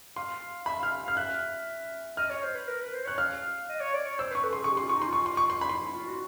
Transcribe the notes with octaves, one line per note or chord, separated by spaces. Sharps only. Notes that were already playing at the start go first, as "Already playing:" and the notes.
F5 C6
E5 B5
F5 F6
F5 F6
E5 F#6
D#5 F6
C#5
C5
B4
A#4
B4
C5
C#5 F#6
F5 F6
D#5
C#5
D5
C#5
C5 E6
B4 C#6
A4
G#4 C6
G4 C#6
F4 C6
C#6
D#4
C6
F4
C#6
C6
C#6
C6
B5
E4 C6
E4
F4
F#4